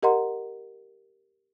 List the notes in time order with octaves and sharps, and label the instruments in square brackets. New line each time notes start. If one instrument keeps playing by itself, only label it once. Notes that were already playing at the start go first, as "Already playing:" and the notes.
[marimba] G4 A#4 D#5 F#5 A#5 C6